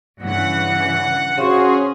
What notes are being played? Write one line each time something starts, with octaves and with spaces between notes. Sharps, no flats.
G2 C#3 E3 F#5
C#3 C#4 F#4 G#4 C5 C6 C#6